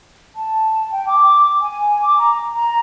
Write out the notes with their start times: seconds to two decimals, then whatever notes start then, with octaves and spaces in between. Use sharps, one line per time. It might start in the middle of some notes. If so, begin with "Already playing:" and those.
0.34 A5
0.91 G5
1.08 D6
1.61 G#5
2.02 D6
2.18 A#5
2.54 A#5